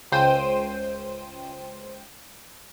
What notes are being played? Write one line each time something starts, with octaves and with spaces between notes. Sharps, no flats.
C#2 C5 G5 D#7